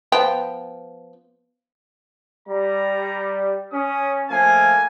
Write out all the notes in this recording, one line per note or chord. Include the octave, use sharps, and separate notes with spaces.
F3 B3 G5
G3 A#5
C#4 D#6
F3 A3 A#3 G#5